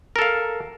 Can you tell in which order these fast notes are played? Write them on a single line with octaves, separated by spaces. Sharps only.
A#4 A4 F5